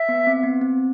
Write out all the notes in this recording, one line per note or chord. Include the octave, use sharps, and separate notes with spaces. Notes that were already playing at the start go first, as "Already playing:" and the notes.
Already playing: E5
B3
C4
B3
C4